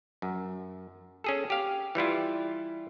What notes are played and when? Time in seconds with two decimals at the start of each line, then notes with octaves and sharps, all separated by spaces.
0.22 F#2
1.24 C#4 G#4 A4
1.50 G4 F5
1.95 E3 G3 E4 F4